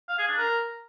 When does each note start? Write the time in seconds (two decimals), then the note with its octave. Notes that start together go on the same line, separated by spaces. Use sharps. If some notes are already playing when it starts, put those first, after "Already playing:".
0.09 F5
0.18 G#4
0.28 D4
0.37 A#4